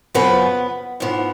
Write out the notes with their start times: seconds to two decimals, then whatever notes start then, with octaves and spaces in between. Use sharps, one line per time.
0.14 F#2 C#3 F3 B3 B4
1.00 G#2 F3 B3